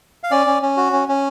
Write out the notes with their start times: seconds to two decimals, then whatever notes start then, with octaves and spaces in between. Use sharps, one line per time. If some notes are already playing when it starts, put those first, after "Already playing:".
0.23 F5
0.31 C#4 D5
0.47 C#4
0.62 C#4
0.77 F#4
0.93 C#4
1.08 C#4